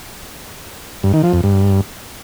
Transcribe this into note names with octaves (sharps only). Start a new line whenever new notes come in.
G2
D#3
F3
F2
G2